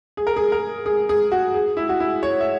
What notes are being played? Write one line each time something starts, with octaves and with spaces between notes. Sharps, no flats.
G#4
A#4
G#4
A#4
G#4
G#4
F#4
G#4
E4
F#4
E4
C#5
E5